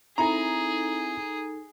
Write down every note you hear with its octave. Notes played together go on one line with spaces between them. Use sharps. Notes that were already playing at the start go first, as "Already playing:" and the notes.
C4 D#4 E4 G#4 A4 A#5